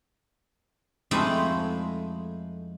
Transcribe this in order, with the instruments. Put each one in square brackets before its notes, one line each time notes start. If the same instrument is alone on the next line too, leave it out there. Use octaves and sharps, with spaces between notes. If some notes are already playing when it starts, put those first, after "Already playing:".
[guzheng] F2 G#3 A3 D#4 E4 C5